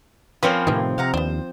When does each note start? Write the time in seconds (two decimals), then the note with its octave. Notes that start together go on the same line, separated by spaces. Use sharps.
0.43 F3 A#3 C4 C#4 B4 C#5 B5
0.67 A2 C3 D#3 B3 A#4 B4
0.98 C3 F5 F#5 A#5
1.14 D#2 B3 D4 C5